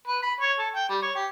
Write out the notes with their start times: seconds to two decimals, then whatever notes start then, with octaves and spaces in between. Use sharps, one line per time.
0.08 B4
0.22 B5
0.41 C#5
0.59 A4
0.75 G5
0.89 G3
1.02 C#5
1.16 G4